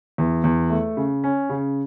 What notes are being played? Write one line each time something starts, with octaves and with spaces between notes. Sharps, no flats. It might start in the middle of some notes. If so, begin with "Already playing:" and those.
E2
E2
A3
C#3
C#4
C#3